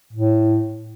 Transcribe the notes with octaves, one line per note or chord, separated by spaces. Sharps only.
A2